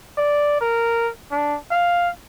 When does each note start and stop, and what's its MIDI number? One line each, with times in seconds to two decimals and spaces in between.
0.18 0.57 74
0.61 1.09 70
1.31 1.57 62
1.71 2.10 77